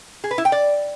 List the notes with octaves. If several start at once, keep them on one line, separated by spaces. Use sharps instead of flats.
G#4
B4
E4
G5
D5